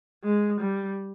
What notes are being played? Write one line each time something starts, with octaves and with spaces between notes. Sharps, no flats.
G#3
G3